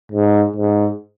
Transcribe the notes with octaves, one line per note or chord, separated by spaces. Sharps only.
G#2
G#2